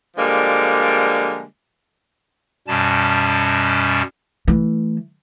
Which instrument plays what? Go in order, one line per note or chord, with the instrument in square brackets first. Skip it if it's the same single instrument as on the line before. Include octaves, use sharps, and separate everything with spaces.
[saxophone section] D3 F3 G3 G#3 A#3
[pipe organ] F#2 B2 G3 C#4 A5
[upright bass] E3 A3